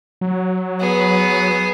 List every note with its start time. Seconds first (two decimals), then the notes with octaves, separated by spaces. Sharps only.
0.21 F#3
0.80 B3 G#4